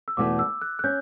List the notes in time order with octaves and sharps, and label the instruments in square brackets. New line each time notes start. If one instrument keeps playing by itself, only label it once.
[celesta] E6
[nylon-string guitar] E2 B2 A3 E4 G4 [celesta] D6
[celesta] E6
F#6
F#6
[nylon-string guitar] C#4 [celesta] G6